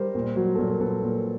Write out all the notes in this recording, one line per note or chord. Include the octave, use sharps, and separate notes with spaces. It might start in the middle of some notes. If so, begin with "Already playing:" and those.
Already playing: G3 A#4 C5
A#2
F#3
A#2 A4
A#4
A#2 A4 B4
A#2